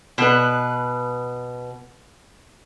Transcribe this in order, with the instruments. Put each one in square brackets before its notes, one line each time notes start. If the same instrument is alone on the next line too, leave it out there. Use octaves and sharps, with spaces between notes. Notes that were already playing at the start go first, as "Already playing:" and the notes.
[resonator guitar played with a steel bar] B2 B4